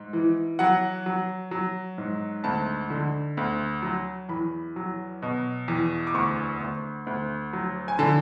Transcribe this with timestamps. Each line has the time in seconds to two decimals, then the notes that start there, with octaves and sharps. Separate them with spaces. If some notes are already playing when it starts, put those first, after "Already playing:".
Already playing: G#2
0.13 E3
0.59 F#3 F#5
1.06 F#3
1.51 F#3
1.98 G#2
2.44 D2 A5
2.90 D3
3.37 D2
3.82 F#3
4.29 E2 B5
4.76 F#3
5.22 B2
5.68 E2
6.07 D6
6.14 D2 C#6
6.60 D2
7.07 D2
7.53 F#3
7.88 G#5
7.99 D3 A5